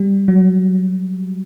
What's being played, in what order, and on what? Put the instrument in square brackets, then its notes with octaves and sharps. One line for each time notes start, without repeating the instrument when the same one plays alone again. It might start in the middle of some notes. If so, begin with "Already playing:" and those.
Already playing: [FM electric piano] G3
F#3